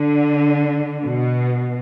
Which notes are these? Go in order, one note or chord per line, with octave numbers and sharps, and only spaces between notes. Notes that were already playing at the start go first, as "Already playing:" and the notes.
Already playing: D3
B2